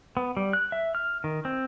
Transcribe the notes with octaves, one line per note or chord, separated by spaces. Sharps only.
B3
G3
F#6
E5
F6
D#3
C4